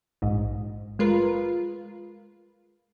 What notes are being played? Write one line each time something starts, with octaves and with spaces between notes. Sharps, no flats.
A#1 G#2
G#3 F4 A#4 B4